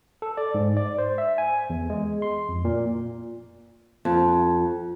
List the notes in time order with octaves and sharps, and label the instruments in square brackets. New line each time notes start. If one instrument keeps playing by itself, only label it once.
[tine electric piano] A4
D5
G#2
D5
C5
E5
G#5
E2
G#3
C6
F2
A#2
[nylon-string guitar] F2